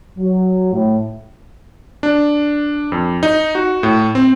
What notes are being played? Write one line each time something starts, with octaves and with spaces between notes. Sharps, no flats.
F#3
A2
D4
F2
D#4
F#4
A2
C4